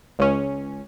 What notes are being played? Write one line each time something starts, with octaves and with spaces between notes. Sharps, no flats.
C#2 C#4